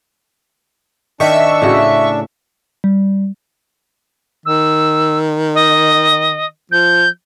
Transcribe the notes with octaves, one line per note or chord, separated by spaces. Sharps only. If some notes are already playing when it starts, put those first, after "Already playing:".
D#3 D4 E5 C#6
A2 C#3 F#4
G3
D#3 E6
D#5
F3 G6